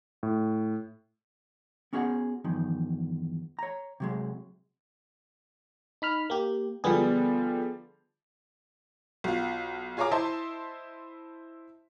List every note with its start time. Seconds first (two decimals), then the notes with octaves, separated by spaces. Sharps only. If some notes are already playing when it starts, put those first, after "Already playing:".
0.23 A2
1.93 B3 C#4 F#4 G#4 C#5 F#5
2.44 E2 G2 D#3 F3
3.59 C#5 A#5
4.00 C3 F#3 G#3
6.02 D#4 B5 F6
6.30 A#3 G4
6.84 D3 F3 G3 B3 G#4
9.24 B1 F4
9.97 F4 G#4 C#5 F5 A#5 D6
10.11 E4 C5 D#5 E5 A5 C6